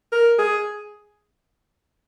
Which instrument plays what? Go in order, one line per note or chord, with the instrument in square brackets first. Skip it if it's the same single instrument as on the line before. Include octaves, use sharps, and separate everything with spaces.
[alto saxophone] A#4
G#4